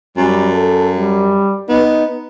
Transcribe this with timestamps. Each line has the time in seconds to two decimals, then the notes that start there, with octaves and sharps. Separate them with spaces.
0.17 F#2 G3
0.52 A4
0.95 G3
1.69 B3 D#4